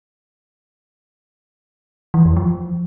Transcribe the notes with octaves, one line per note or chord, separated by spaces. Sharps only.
E3
F2
F3